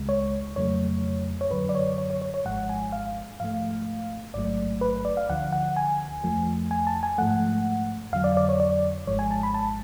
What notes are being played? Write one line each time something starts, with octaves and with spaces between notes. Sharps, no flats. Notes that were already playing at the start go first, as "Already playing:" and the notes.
Already playing: C#2 C#3 G#3
C#5
F2 C#3 F#3 A3 C#5
C#5
F#2 D3 F#3 B4
D5
C#5
C#5
C#5
C#5
C#5
G#1 G#2 F3 G#3 F#5
G#5
F5
G#2 F3 A3 F5
A1 G#2 F#3 A3 D5
B4
D5
F5
D2 D3 F3 F#5
F#5
G#5
F2 F3 A3
G#5
A5
G#5
G#2 F3 A3 F#5
F2 D3 F#3 F5
D5
D5
C#5
D5
G#1 G#2 F3 G#3 C#5
G#5
A5
B5
A5